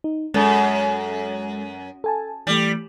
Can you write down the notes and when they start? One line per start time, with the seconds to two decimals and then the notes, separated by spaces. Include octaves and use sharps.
0.04 D#4
0.34 F#2 G#3 A4
2.04 A4 G#5 A5
2.47 E3 G3 A3